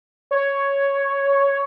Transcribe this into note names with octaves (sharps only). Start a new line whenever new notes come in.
C#5